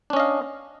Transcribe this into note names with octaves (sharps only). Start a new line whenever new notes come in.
C#4 D4 D#5 F5